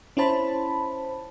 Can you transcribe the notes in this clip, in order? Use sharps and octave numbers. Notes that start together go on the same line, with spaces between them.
C#4 E4 C5 A5 B5